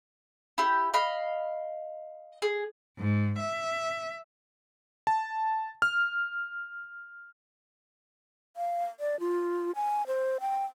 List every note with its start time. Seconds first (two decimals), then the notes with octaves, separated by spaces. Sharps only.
0.58 E4 G4
0.94 D#5 F5 B5
2.42 G#4
2.99 G#2
3.39 E5
5.07 A5
5.82 F6
8.57 F5
9.00 D5
9.20 F4
9.75 G#5
10.07 C5
10.41 G5